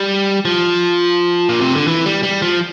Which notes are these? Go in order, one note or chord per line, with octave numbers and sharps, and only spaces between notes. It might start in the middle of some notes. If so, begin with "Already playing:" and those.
Already playing: G3
F3
A#2
C3
D3
E3
G3
G3
F3